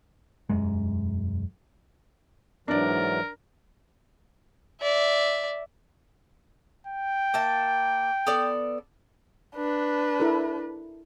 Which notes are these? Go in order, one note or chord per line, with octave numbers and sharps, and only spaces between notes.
E1 F#2 G#3
G#2 E3 F#3 D4 A#4 D5
D5 E5
G5
A#3 E5 A5
B3 A4 D5
D4 B4
E4 A4 A#4